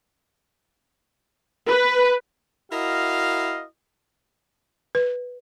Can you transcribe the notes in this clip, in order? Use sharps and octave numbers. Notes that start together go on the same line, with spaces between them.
B4
E4 F#4 A#4 D#5 F5
B4